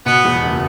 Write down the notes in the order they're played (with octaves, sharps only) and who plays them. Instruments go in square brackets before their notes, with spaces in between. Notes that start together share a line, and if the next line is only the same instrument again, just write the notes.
[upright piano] B2 [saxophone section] B3
[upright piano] E2
F#1